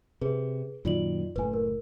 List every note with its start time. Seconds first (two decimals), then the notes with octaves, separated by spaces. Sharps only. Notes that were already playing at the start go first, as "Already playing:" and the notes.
0.21 C3 G#4 B4
0.85 F#2 A#2 D#3 F4 D5 F#7
1.36 F#1 A2 B4 G#5
1.54 A#4